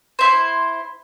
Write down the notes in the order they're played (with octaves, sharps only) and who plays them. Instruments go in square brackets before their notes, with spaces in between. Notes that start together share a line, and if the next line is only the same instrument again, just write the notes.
[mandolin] E4 C5